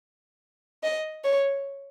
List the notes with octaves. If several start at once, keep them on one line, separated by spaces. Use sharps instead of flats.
D#5
C#5